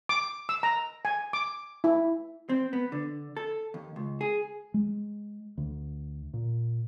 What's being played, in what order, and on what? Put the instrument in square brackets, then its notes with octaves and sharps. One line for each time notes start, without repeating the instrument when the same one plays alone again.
[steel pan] D6
E6
A#5
G#5
D6
E4
[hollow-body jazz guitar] C4
B3
D3
A4
D#2
C#2
G#4
[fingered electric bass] G#3
D2
A#2